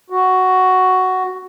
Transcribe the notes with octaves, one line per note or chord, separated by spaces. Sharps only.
F#4